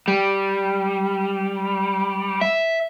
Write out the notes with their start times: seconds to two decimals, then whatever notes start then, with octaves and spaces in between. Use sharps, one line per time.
0.08 G3
2.41 E5